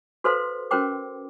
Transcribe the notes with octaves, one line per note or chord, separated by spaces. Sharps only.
F#4 A4 B4 C5 F5 C6
C#4 F#4 A#4 C5 G5 D6